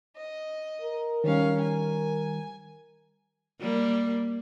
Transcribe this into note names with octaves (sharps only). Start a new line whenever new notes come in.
D#5
A#4
D#3 G3 C#4 F5
G#5
G3 A#3